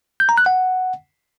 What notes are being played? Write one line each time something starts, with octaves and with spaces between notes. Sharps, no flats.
G6
A#5
F#6
F#5